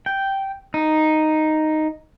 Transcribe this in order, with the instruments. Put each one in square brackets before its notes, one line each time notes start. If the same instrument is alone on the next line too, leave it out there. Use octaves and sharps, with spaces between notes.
[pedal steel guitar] G5
D#4